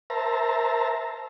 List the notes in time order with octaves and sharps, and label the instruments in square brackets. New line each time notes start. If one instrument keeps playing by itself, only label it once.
[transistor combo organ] A#4 C5 E5 A5 A#5